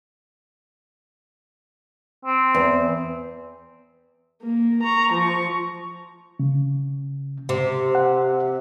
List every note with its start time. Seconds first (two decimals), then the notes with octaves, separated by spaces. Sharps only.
2.25 C4
2.55 E2
4.42 A#3
4.83 A#5 C#6
5.13 F3 C#6
6.39 C#3
7.49 C3
7.95 F#5